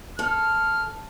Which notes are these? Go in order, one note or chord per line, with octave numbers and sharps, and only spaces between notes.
A4 F6